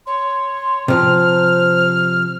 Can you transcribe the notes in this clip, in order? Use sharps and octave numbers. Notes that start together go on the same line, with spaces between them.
C#5 C6
C3 F3 C5 F6